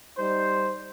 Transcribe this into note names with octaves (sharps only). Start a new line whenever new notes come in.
G3 D#4 C5